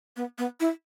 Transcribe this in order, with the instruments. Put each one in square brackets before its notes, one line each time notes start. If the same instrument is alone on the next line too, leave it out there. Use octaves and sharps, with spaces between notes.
[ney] B3
B3
E4